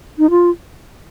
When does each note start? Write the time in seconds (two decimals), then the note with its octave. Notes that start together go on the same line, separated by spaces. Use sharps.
0.18 D#4
0.30 F4